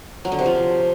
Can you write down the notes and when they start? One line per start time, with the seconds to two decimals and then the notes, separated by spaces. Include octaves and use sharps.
0.25 F#3
0.32 D3
0.39 C3
0.46 F3